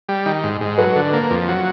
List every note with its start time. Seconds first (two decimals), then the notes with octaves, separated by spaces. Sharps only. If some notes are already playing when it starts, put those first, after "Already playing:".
0.09 G3
0.26 D#3
0.44 G#2
0.61 G#2
0.78 F#3 A4 B4
0.96 D3
1.13 A#3
1.31 F2
1.48 F#3